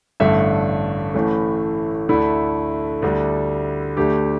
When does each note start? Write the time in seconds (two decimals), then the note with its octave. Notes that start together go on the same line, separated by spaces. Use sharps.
0.20 A1 G2 D3 A3 E5
1.14 A1 A2 E3 A3
2.09 D2 D3 A3 E4
3.02 D2 D3 G3
3.97 D2 D3 A3 G4